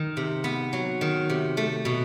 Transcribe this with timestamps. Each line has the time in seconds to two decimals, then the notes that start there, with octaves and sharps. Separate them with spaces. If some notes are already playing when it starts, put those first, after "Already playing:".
Already playing: D#3
0.17 C3
0.44 B3
0.73 F#3
1.01 D#3
1.30 C3
1.57 A3
1.85 B2